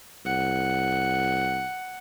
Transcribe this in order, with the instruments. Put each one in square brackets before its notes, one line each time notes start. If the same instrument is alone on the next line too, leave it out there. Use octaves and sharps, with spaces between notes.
[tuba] C2 [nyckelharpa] F#5